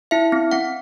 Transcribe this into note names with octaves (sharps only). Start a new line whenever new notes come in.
E4 E5
C4
C4 F#5